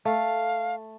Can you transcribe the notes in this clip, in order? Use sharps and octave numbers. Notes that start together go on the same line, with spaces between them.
A3 F5